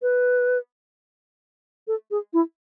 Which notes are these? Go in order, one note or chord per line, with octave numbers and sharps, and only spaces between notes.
B4
A4
G#4
E4